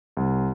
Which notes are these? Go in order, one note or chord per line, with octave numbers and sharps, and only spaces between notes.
C2